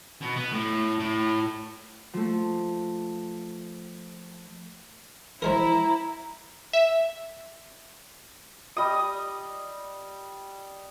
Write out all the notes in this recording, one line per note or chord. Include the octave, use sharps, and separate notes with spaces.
B2
B3
A2
A2
F3 A3
F3 G#3 E4 A#4 A#5
E5
G3 D#5 D#6